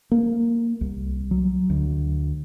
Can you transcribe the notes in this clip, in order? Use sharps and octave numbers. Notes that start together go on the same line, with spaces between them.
A#3
C2
F#3
D2